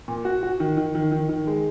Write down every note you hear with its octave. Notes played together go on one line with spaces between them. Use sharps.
A#2
F#4
F#4
D#3
D#3
D#3
D#3
D#3
G#3